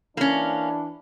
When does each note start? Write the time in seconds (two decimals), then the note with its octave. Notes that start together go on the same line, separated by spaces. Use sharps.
0.17 E3 A#3 C#4 D4